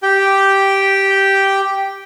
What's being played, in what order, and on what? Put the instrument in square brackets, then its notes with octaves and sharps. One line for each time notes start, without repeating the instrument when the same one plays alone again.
[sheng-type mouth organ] G4 G5